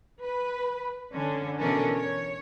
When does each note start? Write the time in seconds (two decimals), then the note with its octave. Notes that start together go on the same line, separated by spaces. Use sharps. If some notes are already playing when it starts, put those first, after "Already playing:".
0.21 B4
1.13 D3 C#4
1.58 B2 E3 C#4 D4 A4 A#4
1.93 C#5